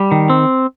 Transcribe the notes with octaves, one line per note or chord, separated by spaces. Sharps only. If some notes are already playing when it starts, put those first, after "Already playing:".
Already playing: G3
D#3
C4